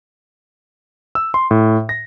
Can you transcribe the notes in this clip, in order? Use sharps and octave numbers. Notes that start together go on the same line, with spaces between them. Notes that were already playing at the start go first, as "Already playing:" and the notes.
E6
C6
A2
A#6